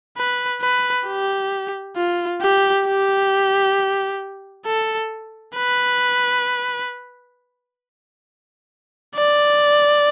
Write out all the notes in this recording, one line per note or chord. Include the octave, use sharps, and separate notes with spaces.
B4
B4
G4
F4
G4
G4
A4
B4
D5